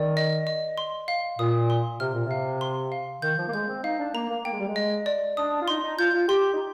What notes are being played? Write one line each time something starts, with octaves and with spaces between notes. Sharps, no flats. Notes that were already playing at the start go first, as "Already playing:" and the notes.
Already playing: D#3 D5
D#5
D#5
C6
F5
A#2 D#6
C6
C3 F6
A#2
C3
F5
C6
F5
D#3 G6
F3
A#3
G#3 G6
C4
D#4 F5
D4
A#3 A#5
A#3
A#3 G5
G#3
G3
G#3
D#5
D5
D4 D#6
F4
D#4 C6
D#4
F4 G6
F4
G4 C6
D#4